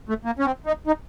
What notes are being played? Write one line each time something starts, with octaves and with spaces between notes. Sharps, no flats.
A3
A#3
C#4
C4
D#4
D#4